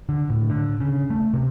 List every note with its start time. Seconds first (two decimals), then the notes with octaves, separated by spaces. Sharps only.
0.09 D3
0.30 A2
0.50 D3
0.80 C#3
1.10 A3
1.34 C3